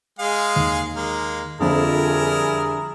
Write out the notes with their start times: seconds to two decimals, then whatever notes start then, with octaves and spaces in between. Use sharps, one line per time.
0.19 G#3 G#4 F5
0.56 D#2
0.96 G#3 A#3
1.61 F2 D3 F3 G3 D4 E4 G#4 A#4